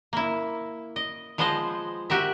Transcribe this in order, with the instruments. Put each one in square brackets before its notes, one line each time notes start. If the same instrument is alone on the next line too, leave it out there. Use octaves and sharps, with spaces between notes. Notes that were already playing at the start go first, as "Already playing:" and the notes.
[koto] A#3 E4
D#5
F3 G#3 B3 F4 C5 D#5
F#4 G4 A#4 E5